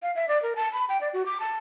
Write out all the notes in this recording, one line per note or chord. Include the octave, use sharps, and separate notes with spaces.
F5
E5
D5
A#4
A5
B5
G5
D5
F#4
D6
A5